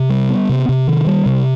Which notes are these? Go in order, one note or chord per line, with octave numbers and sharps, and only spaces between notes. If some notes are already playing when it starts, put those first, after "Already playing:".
Already playing: C3
G3
B3
C3
C3
D#3
G3
C3